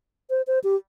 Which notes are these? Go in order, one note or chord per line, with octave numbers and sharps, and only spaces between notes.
C5
C5
G4